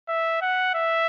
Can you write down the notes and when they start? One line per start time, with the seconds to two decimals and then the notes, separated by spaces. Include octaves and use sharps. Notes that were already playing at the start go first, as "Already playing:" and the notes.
0.09 E5
0.42 F#5
0.75 E5